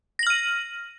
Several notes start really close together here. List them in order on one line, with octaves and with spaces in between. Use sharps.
A#6 F#7 F6 D#7